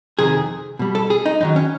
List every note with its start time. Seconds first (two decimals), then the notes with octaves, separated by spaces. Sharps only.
0.19 F2 C3 D#3 G#4
0.79 B2 G3
0.95 A4
1.10 G#4
1.26 D#4
1.40 F#2 D#3 F#3 D#4
1.56 C#4